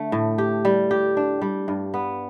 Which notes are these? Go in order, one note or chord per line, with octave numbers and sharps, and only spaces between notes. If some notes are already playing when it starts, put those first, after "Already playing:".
Already playing: D3 A3
A2
G4
G3
G4
D4
G3
G2
B3